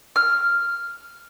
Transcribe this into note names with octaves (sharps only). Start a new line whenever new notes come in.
F6